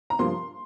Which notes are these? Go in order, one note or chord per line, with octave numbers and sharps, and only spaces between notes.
A#5
G2 F3 A#3 F4 C6